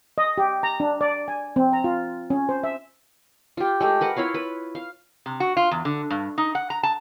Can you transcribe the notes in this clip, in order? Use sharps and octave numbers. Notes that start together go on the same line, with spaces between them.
D#5
G4
A#5
D4
D5
G#5
C4
A#5
F4
C#4
C5
E5
F4 G4
G#3 A3 G4
A#4 B4 F#5
E4 F4 C#5 F5
B4
F5
C3
F#4
F4
E2
D3
G2
D#4
F#5
A#5
A5